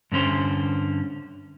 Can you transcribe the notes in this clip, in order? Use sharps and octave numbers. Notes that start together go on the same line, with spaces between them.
G2 D3 C#4 C5